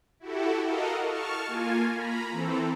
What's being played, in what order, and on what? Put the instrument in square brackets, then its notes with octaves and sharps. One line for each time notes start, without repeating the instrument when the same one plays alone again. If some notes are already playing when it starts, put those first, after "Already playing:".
[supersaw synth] E4 F#4 G4 A4
A4 A#4 D#5 F5 F#5
A5 C#6 F6
A#3 F4 G#5
A#5 B5
E3 C4 A4